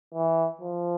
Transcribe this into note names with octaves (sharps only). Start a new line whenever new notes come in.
E3
F3